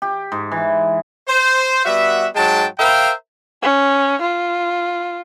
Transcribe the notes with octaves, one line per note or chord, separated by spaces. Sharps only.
G4
G#2
E3
C5
G3 B3 F#4 E5
G#2 F#3 G#3 G5 A5
A#4 C5 E5 F5 G5
C#4
F4